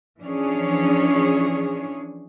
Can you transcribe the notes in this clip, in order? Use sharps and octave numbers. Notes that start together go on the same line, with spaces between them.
E3 F3 C#4 D4 G#4 C#5